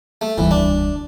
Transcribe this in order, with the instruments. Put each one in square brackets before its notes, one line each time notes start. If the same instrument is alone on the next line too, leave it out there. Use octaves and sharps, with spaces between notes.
[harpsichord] A3
[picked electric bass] E1 D2 G3 [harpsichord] E3
[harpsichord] D4